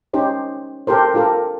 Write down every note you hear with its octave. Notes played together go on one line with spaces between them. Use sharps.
C#4 D#4 G4 C5 C#5
G4 A4 A#4 C5
D4 F4 G4 A4 A#4